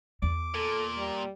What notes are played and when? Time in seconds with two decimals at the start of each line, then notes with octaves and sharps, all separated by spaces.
0.22 E2 D6
0.55 A#2 A4
0.97 G3